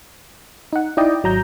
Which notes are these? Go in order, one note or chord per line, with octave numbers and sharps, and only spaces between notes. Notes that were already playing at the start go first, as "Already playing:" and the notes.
D#4 F#5
D#4 E4 D5 D#5 G5
G#1 F#3 A#5 G6